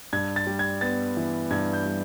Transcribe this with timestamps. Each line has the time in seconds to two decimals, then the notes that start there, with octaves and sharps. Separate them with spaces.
0.13 G2 G#6
0.36 A6
0.47 G3
0.59 G#6
0.81 B3 A6
1.17 E3
1.50 G2 G#6
1.73 G6
1.85 G3